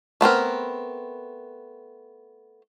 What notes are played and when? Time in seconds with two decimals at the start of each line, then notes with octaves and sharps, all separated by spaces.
0.21 A3 B3 C4 A#4